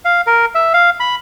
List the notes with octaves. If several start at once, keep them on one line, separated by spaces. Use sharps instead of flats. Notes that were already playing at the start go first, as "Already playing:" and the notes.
F5
A#4
E5
F5
B5